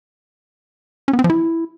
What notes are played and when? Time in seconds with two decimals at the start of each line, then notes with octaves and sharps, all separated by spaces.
1.08 C#4
1.13 B3
1.19 C4
1.24 F3
1.30 E4